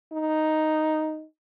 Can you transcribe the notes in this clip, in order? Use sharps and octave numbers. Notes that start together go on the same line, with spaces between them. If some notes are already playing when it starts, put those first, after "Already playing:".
D#4